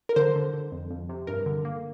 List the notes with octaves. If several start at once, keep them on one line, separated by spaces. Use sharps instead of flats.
A#4
D3 C5
D3
D3
F2
F2
C3
G2 A#4
D3
A#3